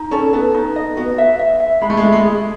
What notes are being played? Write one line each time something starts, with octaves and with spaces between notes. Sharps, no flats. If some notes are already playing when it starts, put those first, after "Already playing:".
Already playing: D#4
C#4 A4
B3 A4
D#4
D#5
B3 F#4
E5
E5
E5
G#3 B5
A3
G#3
A3 E5
G#3
G#4